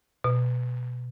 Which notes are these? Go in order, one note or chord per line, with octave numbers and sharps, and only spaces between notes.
B2